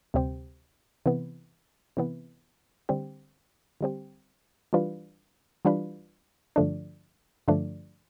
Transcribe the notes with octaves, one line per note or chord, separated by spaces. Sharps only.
D2 C3 G3 C4 G4
C3 E3 B3
C3 E3 B3
D3 G3 C4 G4
D3 G3 C4 G4
E3 G3 D4 F4 B4
E3 G3 D4 F4 B4
G2 D3 F3 A3 D4
G2 D3 F3 A3 D4